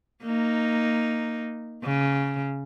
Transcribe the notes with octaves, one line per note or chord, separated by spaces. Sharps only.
A#3 D#4
C#3